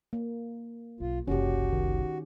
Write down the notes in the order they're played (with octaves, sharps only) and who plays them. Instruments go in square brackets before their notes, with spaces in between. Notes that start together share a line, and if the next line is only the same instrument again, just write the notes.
[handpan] A#3
[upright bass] B1 [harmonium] F4
[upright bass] F#1 C2 [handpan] C#4 G4 [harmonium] F#4
[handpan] D#3